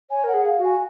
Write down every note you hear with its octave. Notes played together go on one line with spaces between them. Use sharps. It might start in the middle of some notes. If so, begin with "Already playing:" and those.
C#5 G#5
A#4 F#5
G#4
F5
F#4
G#5